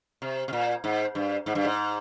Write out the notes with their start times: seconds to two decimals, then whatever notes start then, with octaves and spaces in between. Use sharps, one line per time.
0.22 C3
0.48 C3
0.53 A#2
0.84 G#2
1.15 G2
1.46 G#2
1.55 G2
1.65 G#2